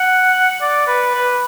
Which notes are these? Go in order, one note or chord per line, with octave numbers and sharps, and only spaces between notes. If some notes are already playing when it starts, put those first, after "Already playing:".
Already playing: F#5
D5
B4
B4